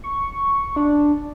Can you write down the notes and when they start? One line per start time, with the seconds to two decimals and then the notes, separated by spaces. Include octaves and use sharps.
0.04 C#6
0.76 D4